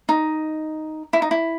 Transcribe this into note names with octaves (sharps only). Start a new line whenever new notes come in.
D#4
E4
D#4
E4